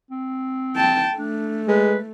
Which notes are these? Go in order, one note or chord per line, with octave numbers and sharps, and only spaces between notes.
C4
G5 A5
A3 D4
G#3 B4